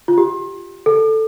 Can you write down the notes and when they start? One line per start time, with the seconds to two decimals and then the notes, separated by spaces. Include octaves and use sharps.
0.08 F4
0.18 G4
0.86 A4